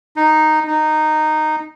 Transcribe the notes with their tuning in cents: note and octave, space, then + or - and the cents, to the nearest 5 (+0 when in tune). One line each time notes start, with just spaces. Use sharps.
D#4 -5
D#4 -10